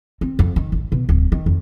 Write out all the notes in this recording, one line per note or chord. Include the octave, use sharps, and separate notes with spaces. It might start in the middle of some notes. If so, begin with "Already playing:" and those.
C4
F2
D#3
A1
B2
D1
D#3
F2